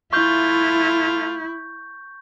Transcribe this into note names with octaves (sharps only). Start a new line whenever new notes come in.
A3 E4 F4 C#6 G6